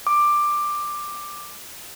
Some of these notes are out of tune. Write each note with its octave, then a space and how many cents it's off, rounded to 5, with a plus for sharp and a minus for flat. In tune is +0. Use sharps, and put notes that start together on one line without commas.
D6 +10